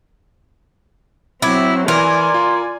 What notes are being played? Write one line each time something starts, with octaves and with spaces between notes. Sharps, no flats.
F#3 C4 E4 B5 D6 G#6
E3 A#4 D5 G#5 C6
F4